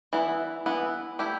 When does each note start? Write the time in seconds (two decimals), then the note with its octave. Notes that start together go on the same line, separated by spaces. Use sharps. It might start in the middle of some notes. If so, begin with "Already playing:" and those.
0.13 E3 B3 E4
0.66 E3 B3 E4
1.19 A3 E4 G4